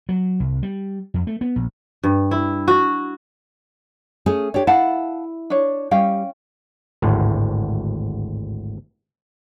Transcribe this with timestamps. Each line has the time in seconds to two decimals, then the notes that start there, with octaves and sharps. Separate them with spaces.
0.09 F#3
0.40 C2
0.63 G3
1.14 F2
1.27 A3
1.41 B3
1.56 A#1
2.03 G2
2.31 E4
2.68 F#4
4.26 A3 C#4 G#4
4.54 D4 G4 C#5
4.67 E4 F5 F#5 A5
5.50 D4 C#5
5.91 G3 C#4 F5 G5
7.02 G#1 D2 A2